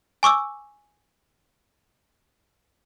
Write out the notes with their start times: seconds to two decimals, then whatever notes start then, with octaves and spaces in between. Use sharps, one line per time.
0.23 G#5 C#6 D6 E6